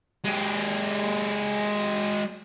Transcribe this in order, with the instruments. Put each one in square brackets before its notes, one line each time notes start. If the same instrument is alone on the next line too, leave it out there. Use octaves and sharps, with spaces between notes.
[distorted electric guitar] G#3 G4